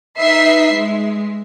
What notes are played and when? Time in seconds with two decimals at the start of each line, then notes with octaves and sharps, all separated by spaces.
0.19 D#4 B4 E5 C7
0.72 G#3